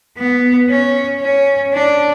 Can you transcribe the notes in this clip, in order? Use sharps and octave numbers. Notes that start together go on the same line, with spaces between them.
B3
C#4
C#4
D4